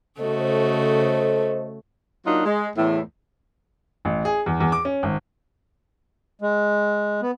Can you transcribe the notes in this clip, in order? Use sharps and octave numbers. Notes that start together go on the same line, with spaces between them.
C#3 A3 F#4 A4 C5 D#5
F#3 A#3 D4 D#4 F4
G#3
E2 A2
A1
G#4
E2
E2
D6
C#4
G#1
G#3
B3